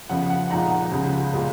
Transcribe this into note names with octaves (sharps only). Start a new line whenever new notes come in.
F2 C#3 F3 B3 F#5
F#5
A#2 F3 G#3 B3 D#4 F#5 A#5
C#2 C#3 F3 G#3
A#2 G#3 B3